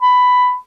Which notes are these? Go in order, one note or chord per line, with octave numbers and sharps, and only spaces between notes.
B5